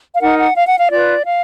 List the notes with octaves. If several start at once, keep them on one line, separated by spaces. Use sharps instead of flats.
F5
D#4 A#4 F#5
F#5
F5
F#5
F5
F4 B4 D5
F5